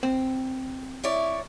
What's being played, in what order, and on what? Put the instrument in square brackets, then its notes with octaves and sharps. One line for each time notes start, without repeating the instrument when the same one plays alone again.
[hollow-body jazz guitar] C4
[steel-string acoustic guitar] E4 C#5 D5